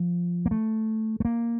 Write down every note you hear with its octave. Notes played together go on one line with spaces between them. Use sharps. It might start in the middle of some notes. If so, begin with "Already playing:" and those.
Already playing: F3
A#3
A3
A3
A#3